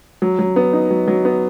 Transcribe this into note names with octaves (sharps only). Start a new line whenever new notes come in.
F#3
F#3
B3
D#4
F#3
F#3
B3